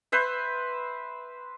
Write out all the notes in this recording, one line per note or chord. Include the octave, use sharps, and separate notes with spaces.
B4 C5 E5